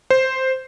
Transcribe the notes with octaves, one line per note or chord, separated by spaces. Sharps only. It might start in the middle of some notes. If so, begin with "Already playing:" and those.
C5